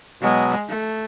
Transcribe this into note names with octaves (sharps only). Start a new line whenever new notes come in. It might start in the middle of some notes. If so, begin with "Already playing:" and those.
B2 F#3 G#3 B3
A3